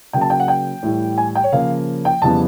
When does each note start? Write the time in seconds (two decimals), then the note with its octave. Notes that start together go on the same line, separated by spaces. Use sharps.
0.13 C#3 F#3 A#3 G5
0.21 A5
0.30 G5
0.40 F#5
0.48 G5
0.83 A2 E3 G3
1.18 G#5
1.35 G5
1.44 C#5
1.52 C#3 F3 A#3 F5
2.05 G5
2.22 F2 C#3 E3 G3 B3 A5